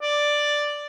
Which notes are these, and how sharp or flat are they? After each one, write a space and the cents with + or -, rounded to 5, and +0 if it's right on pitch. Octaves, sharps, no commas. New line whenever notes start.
D5 +5